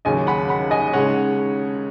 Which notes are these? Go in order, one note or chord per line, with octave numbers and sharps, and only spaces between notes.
D#2 C#3 F#3 C#4 D#5 G#5
F#5 B5
F#5 B5
D#5 G#5
C#3 G#3 D#4 C#5 F#5